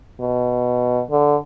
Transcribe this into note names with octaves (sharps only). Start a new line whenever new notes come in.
B2
D3